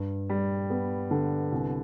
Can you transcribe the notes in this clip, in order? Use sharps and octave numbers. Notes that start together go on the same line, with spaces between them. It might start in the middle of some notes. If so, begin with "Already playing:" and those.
Already playing: G2
G3
B3
D3
C2